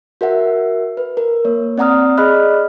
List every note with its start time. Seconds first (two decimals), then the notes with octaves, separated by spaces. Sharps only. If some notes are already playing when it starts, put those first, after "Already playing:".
0.21 F#4 A#4 E5 F#5
0.97 B4
1.17 A#4
1.45 A#3 C#5
1.78 C4 D5 F#5 A#5 D#6 F6
2.18 G#4 D5 D#5 B5 F6 F#6